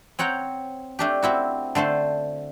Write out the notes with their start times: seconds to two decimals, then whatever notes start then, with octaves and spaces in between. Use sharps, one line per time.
0.19 C4 C#5 F#5 G5 A#5
0.99 A3 D4 G4
1.22 C4 E4 F#4
1.75 D3 A3 C5 A5